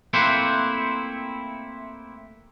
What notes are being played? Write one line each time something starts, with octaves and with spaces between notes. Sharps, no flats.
A3 A#3 C4 E4 B4 C5